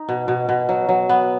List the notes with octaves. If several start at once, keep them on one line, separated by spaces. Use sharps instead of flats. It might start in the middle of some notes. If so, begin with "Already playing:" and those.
Already playing: D#4
B2
B2
B2
F#3
F#3
B3